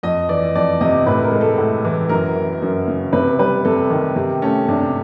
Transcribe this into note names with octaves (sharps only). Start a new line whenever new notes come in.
F2 D#5
E3 D5
F2 D5
C3 D#5
A2 B4
A#4
G#3
A4
A2
E3
F#2 A#4
E3
F#2
C#3
C3 B4
G3 B4
C3 A4
D#3
C3 G4
A3 C#4
C3 D4